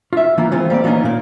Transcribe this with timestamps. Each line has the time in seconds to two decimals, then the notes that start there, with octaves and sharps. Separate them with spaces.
0.13 F4 E5
0.38 E3 A#3 E4 F4
0.52 E3 G#3 B3 C4 F4
0.70 G3 A#3 C4 D5
0.84 E3 G3 A#3 B3 C#4 D#4
1.03 A#2 A#3